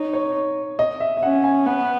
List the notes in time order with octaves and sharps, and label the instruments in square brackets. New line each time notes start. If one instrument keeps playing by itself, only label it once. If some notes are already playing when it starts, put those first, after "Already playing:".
Already playing: [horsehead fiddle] D#4 [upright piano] C#5
[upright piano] C#5
D#5
E5
E5
[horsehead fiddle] C#4 [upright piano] F#5
[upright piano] G#5
[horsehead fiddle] B3 [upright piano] F#5